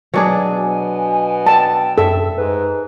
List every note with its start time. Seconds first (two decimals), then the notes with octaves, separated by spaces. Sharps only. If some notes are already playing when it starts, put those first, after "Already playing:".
0.14 B2 F#3 D4 G#4 G#5
0.53 B2
1.46 G5 A5
1.98 F#2 A4 E5
2.38 G#2 B4